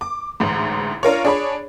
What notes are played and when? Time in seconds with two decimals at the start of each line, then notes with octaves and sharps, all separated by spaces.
0.01 D6
0.40 A1 D2 G#2
1.03 D4 F4 A#4 C#5
1.25 D4 G#4 C#5 B5